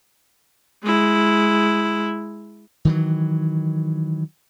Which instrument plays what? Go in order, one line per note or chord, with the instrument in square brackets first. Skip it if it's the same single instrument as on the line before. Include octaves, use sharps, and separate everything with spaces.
[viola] G#3 E4
[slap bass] D#3 E3 F#3